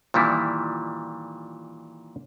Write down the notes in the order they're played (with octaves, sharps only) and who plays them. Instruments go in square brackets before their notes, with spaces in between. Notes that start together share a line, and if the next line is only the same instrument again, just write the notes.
[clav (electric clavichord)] A#2 D#3 E3 G3 E4